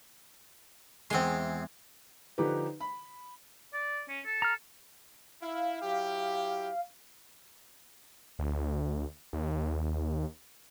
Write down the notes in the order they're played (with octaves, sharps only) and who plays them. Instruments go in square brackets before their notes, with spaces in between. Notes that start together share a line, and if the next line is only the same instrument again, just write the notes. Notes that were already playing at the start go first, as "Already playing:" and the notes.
[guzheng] E2 G#3 [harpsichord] C4 C6
[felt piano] D3 F3 D#4 G4 B4
B5
[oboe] D5
C#4
A4
[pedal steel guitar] A#5 F6
[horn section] E4 [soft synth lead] F5
[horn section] F#3 E4 G4
[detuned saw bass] D2
D#2